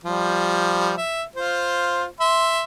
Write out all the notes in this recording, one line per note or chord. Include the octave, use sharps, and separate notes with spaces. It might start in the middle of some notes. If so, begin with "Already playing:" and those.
F3 G3
E5
F4 C5
E5 C6